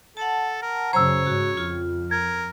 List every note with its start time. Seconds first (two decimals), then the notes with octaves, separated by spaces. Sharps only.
0.17 A4 F#5 A5
0.62 A#4
0.93 F#2 C#3 C5 C#5 A#5 E6
1.26 G#2 F#4
1.57 F2 F4
2.11 A#4 G#6